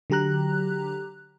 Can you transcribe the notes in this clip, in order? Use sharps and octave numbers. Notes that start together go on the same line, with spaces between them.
D3 F#3 G4 A#5 F#6